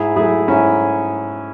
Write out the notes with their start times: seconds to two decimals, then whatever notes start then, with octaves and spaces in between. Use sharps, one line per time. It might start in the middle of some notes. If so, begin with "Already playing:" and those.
Already playing: G#2 E4 G#4
0.16 F#3 A3 E4 G#4
0.48 G#2 C#4 E4